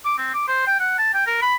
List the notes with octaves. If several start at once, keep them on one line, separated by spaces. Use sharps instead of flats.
D6
C4
D6
C5
G5
F#5
A5
G5
A#4
B5